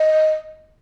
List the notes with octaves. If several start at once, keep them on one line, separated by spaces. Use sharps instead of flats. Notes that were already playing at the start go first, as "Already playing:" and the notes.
Already playing: D#5